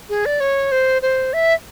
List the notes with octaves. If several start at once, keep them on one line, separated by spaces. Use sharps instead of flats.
G#4
D5
C#5
C5
C5
E5